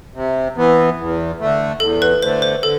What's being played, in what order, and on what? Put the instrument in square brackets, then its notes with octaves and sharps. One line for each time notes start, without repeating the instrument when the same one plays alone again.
[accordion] C3
E3 B3
E2
D3 A3
[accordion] E2 [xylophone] A4
[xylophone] B4
[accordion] D3 A3 [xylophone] C5
[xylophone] C5
[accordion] D3 [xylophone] A4